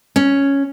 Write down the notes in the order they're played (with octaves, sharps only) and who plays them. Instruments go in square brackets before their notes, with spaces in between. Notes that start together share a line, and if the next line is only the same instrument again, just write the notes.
[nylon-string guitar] C#4